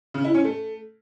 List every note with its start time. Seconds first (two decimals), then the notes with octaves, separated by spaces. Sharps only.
0.14 C#3
0.24 E4
0.35 C#4
0.45 A3